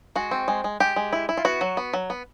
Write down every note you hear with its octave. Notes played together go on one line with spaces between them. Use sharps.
G#3 F#4
C4
G#3
G#3
G#3 G4
G#3
E4
E4
F4
B3 F#4
F#3
B3
F#3
B3